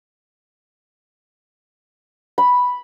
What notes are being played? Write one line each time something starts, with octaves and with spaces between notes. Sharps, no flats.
B5